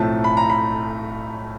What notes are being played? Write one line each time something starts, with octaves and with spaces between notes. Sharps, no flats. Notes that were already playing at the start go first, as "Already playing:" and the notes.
Already playing: B1 A2 F3 A3 C4 A5
B5
A#5
B5